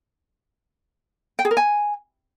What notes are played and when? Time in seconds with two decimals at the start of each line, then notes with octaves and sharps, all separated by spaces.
1.39 G5
1.45 G#4
1.51 A#4
1.57 G#5